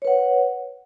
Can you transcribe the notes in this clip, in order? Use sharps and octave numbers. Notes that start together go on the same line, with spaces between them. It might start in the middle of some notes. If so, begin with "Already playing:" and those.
B4 C#5 F#5